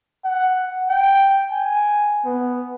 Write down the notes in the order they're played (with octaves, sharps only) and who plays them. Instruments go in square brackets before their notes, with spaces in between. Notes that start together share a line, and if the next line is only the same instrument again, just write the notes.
[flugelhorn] F#5
G5
G#5
B3